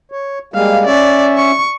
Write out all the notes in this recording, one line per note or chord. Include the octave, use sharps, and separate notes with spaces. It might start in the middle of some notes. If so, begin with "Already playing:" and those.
C#5
G3 G#3 A#3 F5
C#4 C#5 D5 E5
C#6